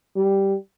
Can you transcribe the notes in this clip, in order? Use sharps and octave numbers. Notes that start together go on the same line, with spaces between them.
G3